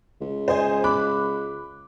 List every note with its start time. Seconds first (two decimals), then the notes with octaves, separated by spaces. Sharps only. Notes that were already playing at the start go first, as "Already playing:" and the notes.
0.21 C#2
0.48 C5 D#5 G#5
0.84 B5 D6 F#6